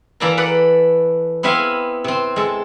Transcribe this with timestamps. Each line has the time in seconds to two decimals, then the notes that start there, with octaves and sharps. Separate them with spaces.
0.20 E3 A#3 E4 D5 A5 A#5
0.37 A4 B4 D5 F#5
1.43 B3 C4 E4 E5 F5 G#5
2.04 C3 C4
2.36 G#3 A4